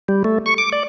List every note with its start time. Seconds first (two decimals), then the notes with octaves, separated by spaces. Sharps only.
0.08 G3
0.24 A3
0.46 C#6
0.58 D6
0.73 D5